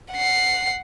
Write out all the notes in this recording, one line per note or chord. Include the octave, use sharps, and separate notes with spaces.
F#5 C7